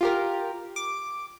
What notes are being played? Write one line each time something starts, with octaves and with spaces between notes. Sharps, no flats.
F4 G4 A#4
D6